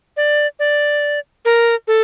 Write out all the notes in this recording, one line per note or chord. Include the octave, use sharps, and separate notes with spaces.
D5
D5
A#4
A4